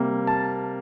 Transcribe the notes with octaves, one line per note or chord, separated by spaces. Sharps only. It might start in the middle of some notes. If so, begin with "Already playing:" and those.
Already playing: C3 G3 A#3
A5